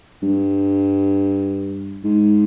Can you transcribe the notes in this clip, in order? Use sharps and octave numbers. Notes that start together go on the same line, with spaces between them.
G2
G#2